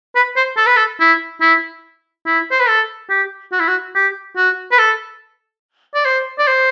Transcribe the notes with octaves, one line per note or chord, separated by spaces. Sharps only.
B4
C5
A4
B4
A4
E4
E4
E4
C5
B4
A4
G4
F#4
E4
F#4
G4
F#4
B4
A4
D5
C5
D5
C5